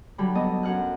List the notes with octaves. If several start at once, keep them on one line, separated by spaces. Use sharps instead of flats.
D3 F#3 G3 B5
B3 A4 D#5
F#2 F#5 F6 F#6